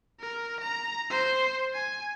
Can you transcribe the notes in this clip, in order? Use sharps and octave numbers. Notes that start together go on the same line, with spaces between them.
A#4
A#5
C5
G#5